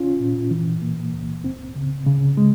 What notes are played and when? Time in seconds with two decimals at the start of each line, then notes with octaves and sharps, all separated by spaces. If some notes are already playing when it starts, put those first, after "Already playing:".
Already playing: C#4 F4
0.20 A#2
0.51 E3
0.82 A#3
1.14 C#2
1.44 C4
1.75 C#3
2.07 C#3
2.37 G#3